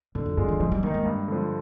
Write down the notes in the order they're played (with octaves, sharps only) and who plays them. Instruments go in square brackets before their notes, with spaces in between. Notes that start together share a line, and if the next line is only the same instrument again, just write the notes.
[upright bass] G#2 [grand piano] D3
[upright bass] F2
[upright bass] G2 [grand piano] G#3 D4 F4
[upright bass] D#3
[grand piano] G#2 [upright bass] F3
[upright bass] G3
[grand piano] D#3 A#3 D#4 [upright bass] G#3
[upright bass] G#3
[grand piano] G2
D3 F3